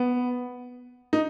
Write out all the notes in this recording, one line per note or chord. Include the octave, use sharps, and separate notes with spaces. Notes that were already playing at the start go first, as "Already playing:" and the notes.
Already playing: B3
D#4